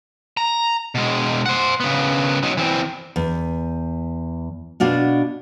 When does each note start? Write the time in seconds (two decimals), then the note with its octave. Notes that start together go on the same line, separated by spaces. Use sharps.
0.37 A#5
0.95 B2 G#3
1.46 C5 F#5
1.80 C#3 B3
2.43 F#3 D#4
2.57 E3 C4
3.16 E2
4.80 B2 D4 F4 F#4